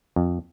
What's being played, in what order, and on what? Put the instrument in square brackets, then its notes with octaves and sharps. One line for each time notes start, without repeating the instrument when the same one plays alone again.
[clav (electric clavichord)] F2